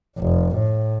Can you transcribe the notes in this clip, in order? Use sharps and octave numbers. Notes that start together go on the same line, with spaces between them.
F1
A2